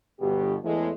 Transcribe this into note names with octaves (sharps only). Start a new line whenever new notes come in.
G1 B2 G4
E2 A2 G#3 A3